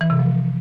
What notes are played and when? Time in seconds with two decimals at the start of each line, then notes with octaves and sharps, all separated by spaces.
0.01 E3
0.10 C3
0.19 F3